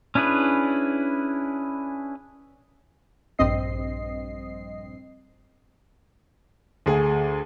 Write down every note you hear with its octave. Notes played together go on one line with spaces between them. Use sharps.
C#4 D4 E4 G#4 B4
A#1 G2 C4 D#5 C7
D2 G#4